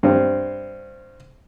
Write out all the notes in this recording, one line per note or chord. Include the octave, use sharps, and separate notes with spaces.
G2 C4